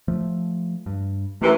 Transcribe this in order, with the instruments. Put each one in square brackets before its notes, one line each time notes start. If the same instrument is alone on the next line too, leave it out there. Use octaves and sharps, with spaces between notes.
[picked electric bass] F3 A3
G2
[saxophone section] F#2 C3 E3 [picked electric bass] A3